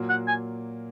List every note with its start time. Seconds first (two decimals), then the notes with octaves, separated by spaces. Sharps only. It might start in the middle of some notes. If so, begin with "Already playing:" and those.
Already playing: A#2 F#3 A#3
0.09 F#5
0.28 G#5